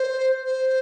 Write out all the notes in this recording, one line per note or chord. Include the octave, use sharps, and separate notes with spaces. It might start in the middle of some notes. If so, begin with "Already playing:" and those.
Already playing: C5
C5